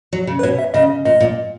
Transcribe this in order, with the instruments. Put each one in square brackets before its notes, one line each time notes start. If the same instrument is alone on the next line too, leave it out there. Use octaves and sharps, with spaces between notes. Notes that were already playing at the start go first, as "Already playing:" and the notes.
[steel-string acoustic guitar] F#3
C#3
[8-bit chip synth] B4
[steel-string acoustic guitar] B2 [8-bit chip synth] C#5
[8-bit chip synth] E5
[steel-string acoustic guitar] C#3 [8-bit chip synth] D#5
[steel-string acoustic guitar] A#2 [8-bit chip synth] D#5
[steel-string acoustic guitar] A#2